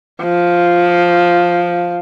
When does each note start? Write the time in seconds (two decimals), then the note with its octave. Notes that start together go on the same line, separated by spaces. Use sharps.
0.22 F3